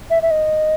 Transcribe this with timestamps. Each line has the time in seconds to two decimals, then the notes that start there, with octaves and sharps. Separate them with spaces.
0.10 E5
0.22 E5
0.30 D#5